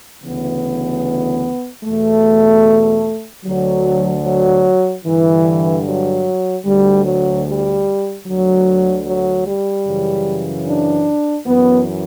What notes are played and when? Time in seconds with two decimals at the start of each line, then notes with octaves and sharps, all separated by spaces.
0.23 D2 C#3 E3 B3
1.84 E2 B2 A3
3.44 D2 D3 F#3
4.24 F#3
5.05 G2 D3 E3
5.84 F#3
6.64 D2 D3 G3
7.05 F#3
7.45 G3
8.25 D2 D3 F#3
9.06 F#3
9.45 G3
9.85 F#2 C#3 E3
10.66 D4
11.45 F#2 E3 B3